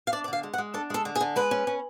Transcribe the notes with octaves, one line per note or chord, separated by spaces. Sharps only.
F5
D4 D5
D5
D3 F5
G#3
F#5
G#3
D4 A4
G#3 A4
D3
G#4
D3
G#3 B4
C#4
C#4